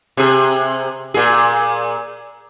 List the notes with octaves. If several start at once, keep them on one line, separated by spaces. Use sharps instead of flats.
C3 G#4
A#2 G#4